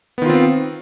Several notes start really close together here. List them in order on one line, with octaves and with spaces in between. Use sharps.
B3 D#3 F4 C4